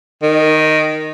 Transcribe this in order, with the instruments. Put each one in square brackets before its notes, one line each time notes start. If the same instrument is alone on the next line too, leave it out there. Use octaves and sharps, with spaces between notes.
[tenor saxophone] D#3